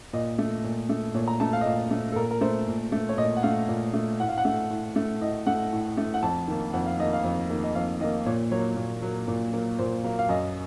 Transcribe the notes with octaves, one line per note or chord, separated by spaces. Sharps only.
A#2 D#5
A3
A#2
A3
A#2 C#5
A#5
A3 A5
F5
D#5
A#2 F5
A3
A4
A#2 A#4
A#4
A3 C5
A#2
A3
C#5
A#2 D#5
F#5
A3 F5
A#2
A3
A2 F#5
F5
F#5
A3
A2
A3
A2 D#5
A3 F#5
A2
A3
F#5
F2 A5
D#3 A#3
F2 F#5
F5
D#3 A#3 D#5
F5
F2
D#3 A#3
D#5
F2 F5
D#3 A#3 D#5
A#2 C#5
F#3 A#3 C#5
A#2
F#3 A#3
A#2
F#3 A#3
A#2 C5
F#3 A#3 A#4
F5
F#2 D#5